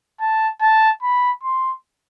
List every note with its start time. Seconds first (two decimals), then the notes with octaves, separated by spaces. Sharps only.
0.20 A5
0.61 A5
1.03 B5
1.44 C6